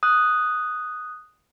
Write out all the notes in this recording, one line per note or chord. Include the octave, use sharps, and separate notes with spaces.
D#6 F#6